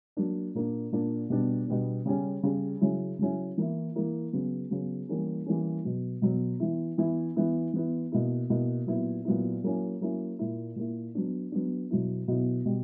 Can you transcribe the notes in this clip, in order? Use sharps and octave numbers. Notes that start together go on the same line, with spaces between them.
F#3 A#3 D4
A#2 A#3 D4
A#2 A#3 D4
B2 G3 B3 D4
B2 G3 B3 D4
C#3 G3 C#4
C#3 G3 C#4
C#3 F#3 C#4 E4
C#3 F#3 C#4 E4
E3 A#3 E4
E3 A#3 E4
C#3 F#3 B3
C#3 F#3 B3
E3 G3 A#3 C#4
E3 G3 A#3 C#4
B2 F#3 B3
B2 F#3 B3
E3 B3 E4
E3 B3 E4
E3 B3 E4
E3 B3 E4
B2 A#3 E4
B2 A#3 E4
A#2 F#3 B3 E4
A#2 F#3 B3 E4
F#3 A#3 C#4 E4
F#3 A#3 C#4 E4
A#2 A#3 E4
A#2 A#3 E4
F#3 B3 D4
F#3 B3 D4
B2 F#3 B3 E4
B2 F#3 B3 E4
B2 G3